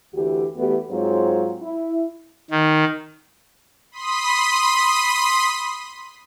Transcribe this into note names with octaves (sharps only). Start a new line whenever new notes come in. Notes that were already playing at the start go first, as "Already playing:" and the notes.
D2 E3 F#4 G4
E2 E3 A3 B3 F#4 G4
G#2 F#3 G#3 C4 F4 C#5
E4
D#3
B5 C6 D#6 B6 D#7